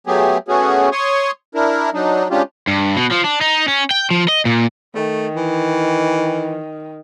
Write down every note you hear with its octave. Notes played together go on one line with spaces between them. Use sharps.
F#3 A3 B3 G4 G#4
A3 B3 C#4 F#4 G#4
C#5 C6 C#6 D#6
D4 E4 A#4
F#3 D4 D#4
G#3 C#4 D4 F4 G4
G2
B2
F3
D4
D#4
C#4
G5
F3
D#5
A#2
D#3 A3
E3